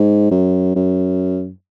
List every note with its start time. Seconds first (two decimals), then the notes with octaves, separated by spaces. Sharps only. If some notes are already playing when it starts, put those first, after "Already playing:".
Already playing: G#2
0.31 F#2
0.75 F#2